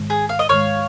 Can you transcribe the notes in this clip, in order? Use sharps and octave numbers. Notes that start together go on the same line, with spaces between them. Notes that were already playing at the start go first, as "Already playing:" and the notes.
Already playing: G#2 D#3 G#3
G#4
F5
D#5
G#2 D#3 G#3 C#5 F5